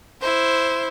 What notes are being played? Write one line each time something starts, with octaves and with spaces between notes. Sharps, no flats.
E4 C5